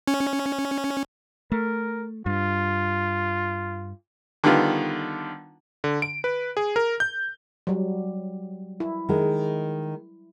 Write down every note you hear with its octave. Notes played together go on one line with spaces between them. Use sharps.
C#4
A3 A#4
G2 F4
D3 D#3 G3 B3 F4
D3
D7
B4
G#4
A#4
G6
F#3 G3
E4
D#3 G#3